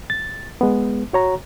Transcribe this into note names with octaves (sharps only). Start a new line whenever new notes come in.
A6
G#3 B3
F#4 C#5 A#5